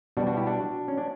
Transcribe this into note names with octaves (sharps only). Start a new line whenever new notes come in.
B2 G3 D4 F#4
D4 F#4
E4 G4
D4 F#4
C#4
D4